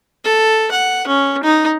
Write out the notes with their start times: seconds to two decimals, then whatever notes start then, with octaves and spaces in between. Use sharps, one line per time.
0.25 A4
0.72 F#5
1.07 C#4
1.44 D#4